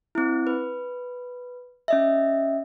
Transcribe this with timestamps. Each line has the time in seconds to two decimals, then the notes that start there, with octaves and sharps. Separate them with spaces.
0.15 C4 E4
0.47 B4
1.88 C#4 D#5 E5